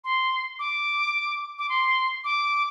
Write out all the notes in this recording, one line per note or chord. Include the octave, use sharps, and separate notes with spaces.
C6
D6
D6
C6
D6